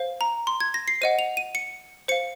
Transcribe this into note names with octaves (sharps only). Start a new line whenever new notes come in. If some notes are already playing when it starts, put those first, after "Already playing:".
Already playing: C5 F5
A#5
C6
G#6
A#6
C7
C5 D#5 F#5 D#7
F7
D#7
C#7
C5 F5 C#7